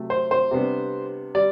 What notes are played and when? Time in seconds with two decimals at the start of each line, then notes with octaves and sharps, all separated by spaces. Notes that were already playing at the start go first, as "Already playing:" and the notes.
Already playing: C3 F#3 A3
0.10 C5
0.31 C5
0.51 C3 G3 B3 D4
1.35 G3 D5